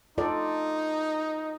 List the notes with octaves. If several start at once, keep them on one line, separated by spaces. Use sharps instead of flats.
D#4 F4 A4 D5